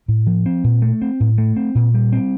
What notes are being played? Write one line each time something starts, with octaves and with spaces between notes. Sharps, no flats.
A2
F3
C4
A#2
A3
C4
A2
A3
C4
A#2
G3
C4